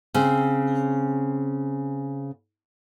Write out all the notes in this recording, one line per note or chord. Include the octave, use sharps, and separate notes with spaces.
C#3 C4